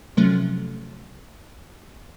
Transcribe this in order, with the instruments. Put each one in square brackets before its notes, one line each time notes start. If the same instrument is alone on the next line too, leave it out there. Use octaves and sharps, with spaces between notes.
[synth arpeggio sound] C3 F3 F#3 A3 C#4